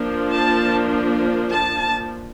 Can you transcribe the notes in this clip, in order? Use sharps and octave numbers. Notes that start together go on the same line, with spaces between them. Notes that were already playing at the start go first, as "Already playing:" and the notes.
Already playing: F3 A#3 D4
A5
A5